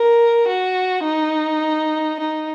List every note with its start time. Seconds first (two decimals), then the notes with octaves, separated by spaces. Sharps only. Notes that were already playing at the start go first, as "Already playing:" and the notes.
Already playing: A#4
0.48 F#4
1.05 D#4
2.20 D#4